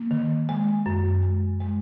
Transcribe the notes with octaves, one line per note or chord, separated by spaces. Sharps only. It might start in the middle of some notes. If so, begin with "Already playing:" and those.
Already playing: A#3
D#3
G#3
F#2
G#3
G#3